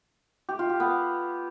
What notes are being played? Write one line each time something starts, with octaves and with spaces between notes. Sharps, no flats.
G4
F4
G4
B3